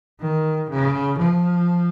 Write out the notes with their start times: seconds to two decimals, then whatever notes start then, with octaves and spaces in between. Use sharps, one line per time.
0.20 D#3
0.69 C#3
1.18 F3